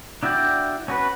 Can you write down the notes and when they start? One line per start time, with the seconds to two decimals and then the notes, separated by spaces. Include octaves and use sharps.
0.23 D4 E4 F#4 D5 G5
0.88 C#4 F#4 B4